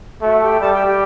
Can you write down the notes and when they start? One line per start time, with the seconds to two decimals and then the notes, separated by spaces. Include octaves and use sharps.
0.21 A3 F#4 F#5
0.40 G4 G5
0.60 G3 A4 A5
0.73 G4 G5
0.86 G4 G5